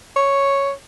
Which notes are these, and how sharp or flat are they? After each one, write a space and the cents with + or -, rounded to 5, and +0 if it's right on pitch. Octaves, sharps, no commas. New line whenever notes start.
C#5 +0